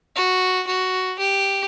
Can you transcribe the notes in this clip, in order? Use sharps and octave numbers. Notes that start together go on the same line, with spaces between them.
F#4
F#4
G4